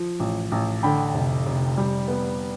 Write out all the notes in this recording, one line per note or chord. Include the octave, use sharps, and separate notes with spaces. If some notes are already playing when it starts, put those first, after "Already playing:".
Already playing: F3
A1
A1
D3 G5 B5
F1
F1
G3
B3